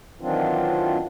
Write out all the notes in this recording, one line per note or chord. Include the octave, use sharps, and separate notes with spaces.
D#3 E3 F#3 C4 D4 F4